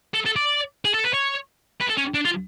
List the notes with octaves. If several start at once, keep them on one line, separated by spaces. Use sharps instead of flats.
A4
A4
D5
G#4
A4
B4
C#5
B4
A4
C#4
D4
F4